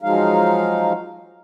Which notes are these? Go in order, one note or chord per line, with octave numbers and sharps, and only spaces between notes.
F3 F#3 G#3 D#4 F5